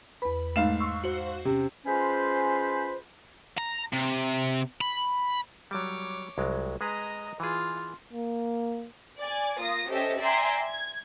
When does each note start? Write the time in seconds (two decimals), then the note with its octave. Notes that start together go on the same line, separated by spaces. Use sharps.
0.22 E2 B4 B5
0.56 G#2 A3 F5 E7
0.80 C6 C#6 E6
1.04 F#4 C5
1.45 C3 C#4
1.86 G#3 C#4 F4 B4 C5
3.58 A#5
3.93 C3
4.81 B5
5.71 F#3 G3 C#5 D6
6.38 C2 F#3 G#3
6.81 G#3 G#4 B4 D#5 A#5
7.40 E3 F4 G#4
8.13 A#3
9.18 D5 G#5
9.57 A#3 F4 D#6 A#6
9.88 C#4 G4 A4 C5 D#5 E5
10.18 D5 E5 G5 G#5 A#5 C6
10.67 G#6